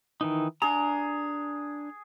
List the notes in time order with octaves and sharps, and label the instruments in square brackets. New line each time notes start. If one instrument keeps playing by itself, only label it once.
[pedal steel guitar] D#3 E3 D#4
[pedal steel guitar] D4 A#5 [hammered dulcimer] G#4